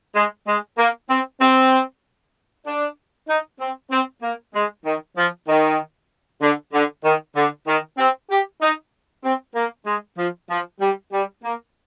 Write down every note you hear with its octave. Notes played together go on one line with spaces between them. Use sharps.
G#3
G#3
A#3
C4
C4
D4
D#4
C4
C4
A#3
G#3
D#3
F3
D#3
D3
D3
D#3
D3
D#3
C4
G4
D#4
C4
A#3
G#3
F3
F3
G3
G3
A#3